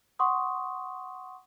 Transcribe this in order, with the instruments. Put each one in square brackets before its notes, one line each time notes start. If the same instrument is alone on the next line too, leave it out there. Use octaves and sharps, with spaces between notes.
[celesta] F#5 C6 C#6 D#6